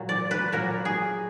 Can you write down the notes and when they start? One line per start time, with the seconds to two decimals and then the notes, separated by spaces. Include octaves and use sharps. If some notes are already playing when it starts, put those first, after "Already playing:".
Already playing: A#2 F#3
0.09 D5
0.31 B4
0.52 A#2 F#3 A#4
0.85 G#4